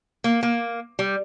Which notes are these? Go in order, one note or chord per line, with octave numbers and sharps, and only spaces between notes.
A#3
A#3
G3